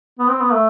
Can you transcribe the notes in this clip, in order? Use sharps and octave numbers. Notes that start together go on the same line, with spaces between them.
B3
C4
B3
A3